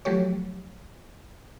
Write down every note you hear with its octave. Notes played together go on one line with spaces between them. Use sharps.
F3 F#3 A3 G4 C#5